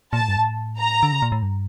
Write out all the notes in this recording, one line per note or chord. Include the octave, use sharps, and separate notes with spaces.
A#2 A5
A2
G2
A2
A#5
D3
C#3
A#2
A2
G2